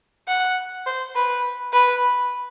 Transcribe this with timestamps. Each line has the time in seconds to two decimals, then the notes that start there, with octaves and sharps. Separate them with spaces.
0.28 F#5
0.86 C5
1.15 B4
1.73 B4